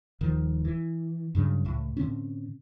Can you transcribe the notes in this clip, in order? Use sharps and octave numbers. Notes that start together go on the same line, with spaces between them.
D#1 D#3 F3
E3
G2 C#3 F#3
C#2 A2
A2 D3 C4 C#4